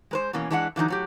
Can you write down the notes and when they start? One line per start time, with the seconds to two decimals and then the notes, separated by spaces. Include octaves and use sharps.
0.11 G#3 B4 C5
0.33 B2 E3 A#3 C#4
0.51 E3 G#3 D4 E4 F4 F#5
0.76 D3 E3 F#3 C#4 D#4
0.88 A2 F#3 G4